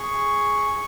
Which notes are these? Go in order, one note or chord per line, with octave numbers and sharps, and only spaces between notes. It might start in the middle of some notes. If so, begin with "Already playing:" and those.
Already playing: G#4 C#6